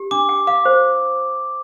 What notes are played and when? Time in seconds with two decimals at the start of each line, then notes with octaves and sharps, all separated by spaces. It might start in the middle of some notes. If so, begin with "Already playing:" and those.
Already playing: G4
0.11 D4 D6
0.29 G5
0.47 F5 D6
0.65 C5